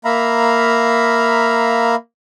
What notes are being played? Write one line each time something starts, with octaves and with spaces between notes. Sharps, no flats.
A#3 E5 F5 A#5 B5